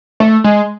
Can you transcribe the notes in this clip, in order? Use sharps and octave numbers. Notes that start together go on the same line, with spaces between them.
A3
G#3